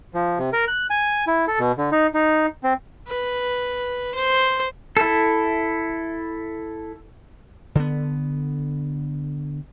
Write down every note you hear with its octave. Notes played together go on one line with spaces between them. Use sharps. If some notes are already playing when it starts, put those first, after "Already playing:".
F3
C3
A#4
F#6
G#5
E4
A4
B2
D3
D#4
D#4
C4
B4
C5
E4 A4
D3 B3